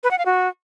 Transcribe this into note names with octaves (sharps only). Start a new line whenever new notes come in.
B4
F#5
F5
F#4